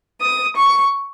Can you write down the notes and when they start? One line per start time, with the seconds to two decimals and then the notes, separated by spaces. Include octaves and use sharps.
0.20 D#6
0.56 C#6